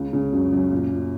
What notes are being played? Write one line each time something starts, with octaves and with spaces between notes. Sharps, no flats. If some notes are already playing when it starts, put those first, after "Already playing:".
Already playing: C#2 C#3
C#3
F#2
F#2
A#2
A#2